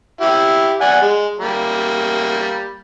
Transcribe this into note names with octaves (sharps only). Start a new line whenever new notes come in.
E4 G4
D5 F#5 G#5
G#3
G3 A#3